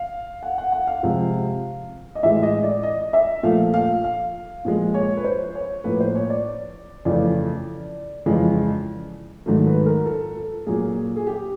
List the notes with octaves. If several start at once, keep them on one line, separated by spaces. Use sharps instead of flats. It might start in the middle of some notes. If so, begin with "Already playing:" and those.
Already playing: F5
F#5
F#5
F#5
F5
C3 F3 G#3
D#5
A2 E3 G#3 E5
D#5
D5
D#5
E5
A#2 F3 A3 F5
F5
F5
A#2 F3 G#3
C#5
B4
C5
C#5
A2 F3 A#3 B4
C5
C#5
D5
F2 C#3 E3 A3 D5
F2 C#3 E3 G#3
G#2 D#3 F#3 A3
B4
A#4
A4
A4
A#2 F#3 A#3 G#4
G#4
G4